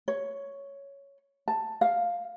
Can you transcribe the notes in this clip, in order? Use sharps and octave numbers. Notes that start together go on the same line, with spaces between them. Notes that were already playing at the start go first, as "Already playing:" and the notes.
C#5
A5
F5